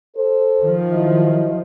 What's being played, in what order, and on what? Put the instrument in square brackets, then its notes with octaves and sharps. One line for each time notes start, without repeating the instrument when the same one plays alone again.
[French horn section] A4 C5
[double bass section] D#3 F3
[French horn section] F#3 E4 D#5